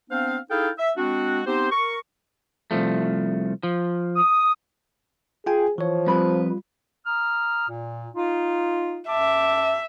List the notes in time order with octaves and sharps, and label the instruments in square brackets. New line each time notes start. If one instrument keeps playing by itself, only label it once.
[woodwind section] B3 C4 D4 C5 F5
D#4 E4 G#4 A4 F5 G5
E5
G#3 C4 D4 F#4
B3 C4 D#4 G4 C5
A#4 C#6
[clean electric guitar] C2 F3 A3
F3
[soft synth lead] D#6
[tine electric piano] F4 G5 G#5 [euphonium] G#4
[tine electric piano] E3 C#5 [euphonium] F3
[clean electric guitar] F2 B4 [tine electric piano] G3 F4
[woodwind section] A#5 D#6 F6
A#2
D#4 F4
[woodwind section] F#2 A5 D6 [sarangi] E5